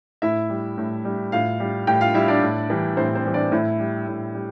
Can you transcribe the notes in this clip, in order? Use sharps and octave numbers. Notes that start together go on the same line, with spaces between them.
A2 E4 E5
G3
A2
G3
A2 F4 F5
G3
A2 G4 G5
F4 F5
G3 E4 E5
D4 D5
A2
E3 G3
A2 C4 C5
C4 C5
E3 G3
D4 D5
A2 E4 E5
G3
A2
G3